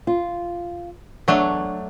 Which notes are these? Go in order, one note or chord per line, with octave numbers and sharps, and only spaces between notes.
F4
E2 F#3 A3 D4 C#5